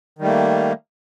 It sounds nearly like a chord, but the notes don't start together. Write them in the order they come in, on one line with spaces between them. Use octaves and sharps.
D#3 G3 A3 A#3